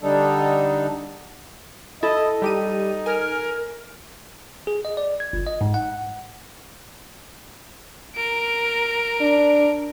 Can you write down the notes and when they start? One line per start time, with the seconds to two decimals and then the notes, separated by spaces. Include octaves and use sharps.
0.02 D3 G3 D4 D#4 A4
2.03 E4 A4 D#5
2.42 G3 D#4 G4 D#7
3.06 A#4 G#5 F6
4.67 G#4
4.85 D#5
4.97 D5
5.20 G#6
5.33 G1
5.47 D#5
5.61 G#2
5.74 F#5
8.15 A#4 D7
9.21 D4